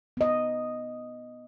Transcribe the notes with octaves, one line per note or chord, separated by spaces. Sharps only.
B3 D#5